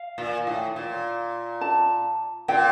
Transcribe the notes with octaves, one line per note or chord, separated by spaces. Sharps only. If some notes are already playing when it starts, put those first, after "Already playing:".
Already playing: F5
A#2
A2
A#2
A5
A#2 G5